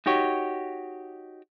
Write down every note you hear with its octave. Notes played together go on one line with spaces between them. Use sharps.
D#4 F#4 G4 C#5